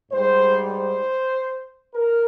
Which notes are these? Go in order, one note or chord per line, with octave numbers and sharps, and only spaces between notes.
G#2 G3 C5
C5
A#4